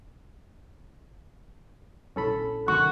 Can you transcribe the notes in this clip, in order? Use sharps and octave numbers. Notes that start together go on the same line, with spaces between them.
A#1 C#4 E4 A4 B5
D#3 A3 F#4 C#6